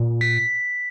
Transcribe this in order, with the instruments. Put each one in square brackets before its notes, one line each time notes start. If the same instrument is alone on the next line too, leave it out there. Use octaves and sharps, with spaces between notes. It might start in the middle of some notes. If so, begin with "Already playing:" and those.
Already playing: [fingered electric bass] A#2
[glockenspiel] B6